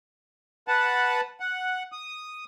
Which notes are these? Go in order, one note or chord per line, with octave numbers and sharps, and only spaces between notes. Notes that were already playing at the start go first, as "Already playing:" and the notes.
B4 F#5 A5
F#5
D#6